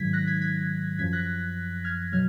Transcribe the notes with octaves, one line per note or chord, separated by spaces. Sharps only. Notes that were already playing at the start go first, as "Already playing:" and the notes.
Already playing: G#2 D#3 F#3 G#6 B6
F#6 A#6
G#6 B6
G#6 B6
F#2 F3 G#6 B6
F#6 A#6
F6 G#6
B2 F#3 F6 G#6